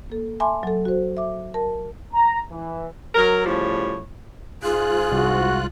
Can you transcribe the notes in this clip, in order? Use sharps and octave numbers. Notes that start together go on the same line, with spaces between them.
A#3 A4
E5 G#5 A5 B5 C6 D6
F#3 A4
F#4 C5
E5 D6
A#4 A5
A#5
E3
F#3 A#4
A2 C#3 F3 G3 C#5
G#2 F4 G#4 F#6
C2 F#4